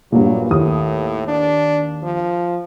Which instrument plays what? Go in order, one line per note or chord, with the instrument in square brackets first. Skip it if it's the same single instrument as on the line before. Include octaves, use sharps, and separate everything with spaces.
[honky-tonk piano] G2 A#2 [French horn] F#3
[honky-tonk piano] D#2 D#6 [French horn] A2
[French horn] D4
F3